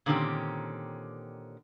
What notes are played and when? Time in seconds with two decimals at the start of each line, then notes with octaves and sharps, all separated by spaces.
0.06 A#2 D3 D#3 C4 C#4 G4